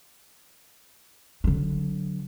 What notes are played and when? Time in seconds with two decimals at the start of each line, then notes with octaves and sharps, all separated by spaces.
1.44 D3 F#3